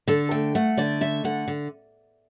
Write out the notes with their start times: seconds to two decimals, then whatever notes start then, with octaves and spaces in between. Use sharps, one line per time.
0.07 D3 A4
0.31 A3 G5
0.55 A3 F#5
0.77 D3 D5
1.01 A3 E5
1.24 D3 F#5
1.48 D3